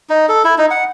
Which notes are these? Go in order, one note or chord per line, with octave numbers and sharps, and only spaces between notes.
D#4
A4
E4
D#4
F#5